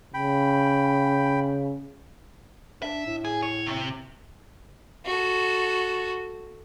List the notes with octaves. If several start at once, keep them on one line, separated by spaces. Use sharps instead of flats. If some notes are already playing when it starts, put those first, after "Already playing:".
C#3 G5 B5
D4 E5
A2
G#4
C#5
C3
F#4 A4